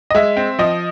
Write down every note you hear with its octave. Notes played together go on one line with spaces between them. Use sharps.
D#5
G#3 E5
C4
F3 D#5